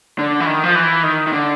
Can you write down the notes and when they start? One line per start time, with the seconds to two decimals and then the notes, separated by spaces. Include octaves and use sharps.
0.19 D3
0.40 E3
0.46 D#3
0.64 F3
0.75 E3
1.03 D#3
1.27 D#3
1.33 D3